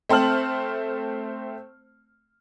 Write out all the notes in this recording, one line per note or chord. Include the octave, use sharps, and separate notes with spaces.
A3 C4 C5 A5 F6 F#7